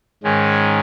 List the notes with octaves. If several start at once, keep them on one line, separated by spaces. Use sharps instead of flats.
G#2 D#3 G#3 C#4